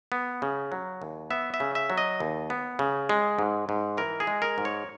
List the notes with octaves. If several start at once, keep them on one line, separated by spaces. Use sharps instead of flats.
B3
C#3
F#3
D#2
B3 E5
E5
C#3
E5
F#3
D#5
D#2
B3
C#3
G#3
G#2
G#2
E3 A#4
G#4
G#3
A#4
G#2
C#5